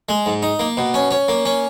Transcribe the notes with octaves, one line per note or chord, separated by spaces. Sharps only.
G#3
G#2
D#4
A#3
B2
C#4
C#4
A#3
C#4